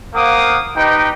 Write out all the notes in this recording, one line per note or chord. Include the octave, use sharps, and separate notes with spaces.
A#3 C5 F5 F#5 D6 D#6
D#4 G4 B4 D#5 G5